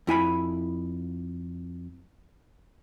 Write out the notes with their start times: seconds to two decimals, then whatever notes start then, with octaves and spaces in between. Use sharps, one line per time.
0.07 F2 E4 G#5 B5